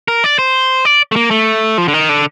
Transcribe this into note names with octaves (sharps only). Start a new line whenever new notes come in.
A#4
D5
C5
D5
A3
A#3
A3
F3
D3
D#3
D3